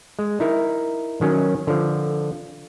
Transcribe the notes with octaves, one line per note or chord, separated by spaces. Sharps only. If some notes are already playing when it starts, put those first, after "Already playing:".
G#3
D#4 E4 A#4
D#3 F#3 C#4
D3 F3